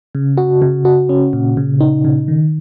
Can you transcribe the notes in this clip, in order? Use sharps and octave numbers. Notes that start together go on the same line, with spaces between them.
C#3
F#4
C#3
F#4
C#4
A#2
C#3
D#4
C#3
D#3